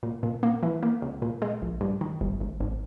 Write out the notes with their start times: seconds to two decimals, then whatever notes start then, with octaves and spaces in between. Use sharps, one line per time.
0.03 A#2
0.23 A#2
0.43 A#3
0.63 E3
0.83 A#3
1.02 C#2
1.22 A#2
1.42 G#3
1.62 A#1
1.81 G2
2.01 D#3
2.21 G1
2.40 G#1
2.60 G#1